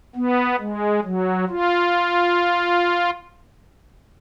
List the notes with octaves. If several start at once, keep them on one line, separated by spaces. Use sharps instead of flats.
B3
G#3
F#3
F4